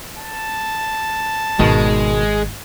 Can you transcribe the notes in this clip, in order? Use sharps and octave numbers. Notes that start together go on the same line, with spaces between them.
A5
G#1 B2 D#3 G#3